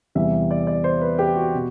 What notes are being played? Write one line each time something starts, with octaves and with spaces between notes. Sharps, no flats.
E2 C3 E3 G3 E5
D5
D5
C5
B4
G4
F#4
B2